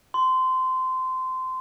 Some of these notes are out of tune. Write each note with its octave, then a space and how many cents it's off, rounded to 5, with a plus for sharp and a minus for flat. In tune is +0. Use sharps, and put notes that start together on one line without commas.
C6 -20